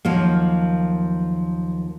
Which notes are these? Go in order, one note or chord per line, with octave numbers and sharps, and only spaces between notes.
D#2 F3 F#3 A#3